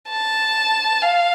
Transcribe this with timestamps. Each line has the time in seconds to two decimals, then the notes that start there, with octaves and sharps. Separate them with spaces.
0.10 A5
1.02 F5